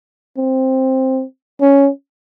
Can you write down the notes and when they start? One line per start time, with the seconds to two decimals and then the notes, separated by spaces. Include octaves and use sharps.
0.38 C4
1.61 C#4